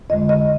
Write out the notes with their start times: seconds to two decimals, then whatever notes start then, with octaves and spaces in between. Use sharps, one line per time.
0.10 F2 D3 G#3 D#5
0.29 D#5